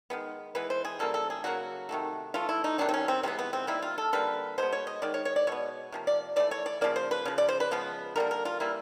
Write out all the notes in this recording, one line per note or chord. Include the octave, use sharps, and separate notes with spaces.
D#3 G#3 B3
E3 G#3 B3 B4
C5
G#4
C#3 E3 G3 A#3 A4
A4
G#4
C#3 F#3 A#3 F#4
C3 D#3 F#3 A3
E3 A3 F4
E4
D#4
C3 D#3 F#3 D4
C4
C#4
C4
C3 E3 G#3 B3 C4
B3
C4
D#3 G3 A#3 E4
F4
A4
D3 G3 A#3 B4
B2 G#3 B3 C5
C#5
D#5
D#3 G#3 D5
C#5
C#5
D5
B2 G#3 B3 C#5
C3 F3 A#3
D5
E3 A3 D5
C#5
D5
C#3 F3 A#3 D5
C5
B4
C#3 F3
D5
C5
B4
C#3 F3 G#3 B3
D3 G3 A#3 A#4
A#4
F4
E3 G3 A#3 E4